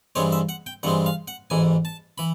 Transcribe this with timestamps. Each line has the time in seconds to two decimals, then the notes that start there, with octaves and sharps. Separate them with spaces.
0.15 G2 E3 G#3 C4 C#5
0.32 E5
0.49 F#5
0.66 G5
0.83 G2 E3 G#3 C4 F#5
1.06 F5
1.28 F#5
1.50 A1 G#2 E3 G#5
1.85 A5
2.18 E3 B5